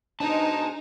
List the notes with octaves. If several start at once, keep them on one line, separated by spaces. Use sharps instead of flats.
G#2 B2 G#3 D4 D#4 A5